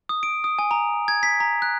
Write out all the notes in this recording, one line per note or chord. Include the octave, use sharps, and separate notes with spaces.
D#6
D7
D#6
G#5
A#5
G#6
B6
A#5
F#6